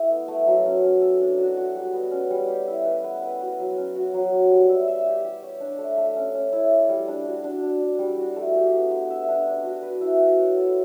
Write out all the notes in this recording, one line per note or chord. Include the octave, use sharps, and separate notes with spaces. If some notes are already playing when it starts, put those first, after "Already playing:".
Already playing: A3 E4
B3
A3
F#3
C#4
C#4
A4
D4
F#4
F#4
G3
B3
C#4
G3
G4
E4
B4
B3
B4
F#4
F#3
C#4
F#4
F#3
C#5
G3
E5
E5
G4
G4
C#5
D4
A3
A3
C#4
C#4
E4
D5
G3
D4
F#4
D4
D4
D4
G3
F#4
A3
G4
B3
B3
E5
D4
D4
F#4
B4
E4
F#4
C#5
A4